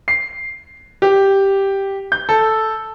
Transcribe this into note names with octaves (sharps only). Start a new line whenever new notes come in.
C7
G4
G6
A4